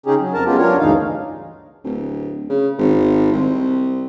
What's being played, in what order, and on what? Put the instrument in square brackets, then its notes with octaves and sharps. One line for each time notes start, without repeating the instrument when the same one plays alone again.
[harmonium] C#3 C#4 D#4 G4 G#4
F#3
F2 A#4 A5
F#3 G#3 B3 C#4 F4 G4
F#3 D4 F4 A#4 C#5
D2 G2 C#3 E3 D#4 F5
[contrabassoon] D1
C#3
G#1
C2